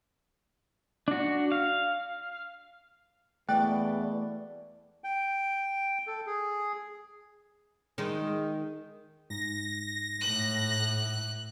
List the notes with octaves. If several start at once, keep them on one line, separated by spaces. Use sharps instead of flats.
D4 F#4
F5
E2 B2 A3 D5 G5 F#6
G5
A4
G#4
D#3 G#3 D#4
G#2 A#6
A2 F#6